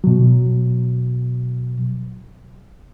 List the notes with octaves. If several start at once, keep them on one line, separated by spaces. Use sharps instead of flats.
B2 F#3